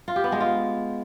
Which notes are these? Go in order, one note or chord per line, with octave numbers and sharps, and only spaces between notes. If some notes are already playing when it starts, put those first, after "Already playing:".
F4
G4
B3
G#3
F4